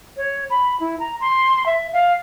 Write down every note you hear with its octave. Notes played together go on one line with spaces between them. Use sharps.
C#5
B5
E4
A#5
C6
E5
F5